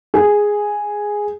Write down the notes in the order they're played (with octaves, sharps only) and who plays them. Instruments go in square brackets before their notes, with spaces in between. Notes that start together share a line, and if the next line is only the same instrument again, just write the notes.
[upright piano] G#4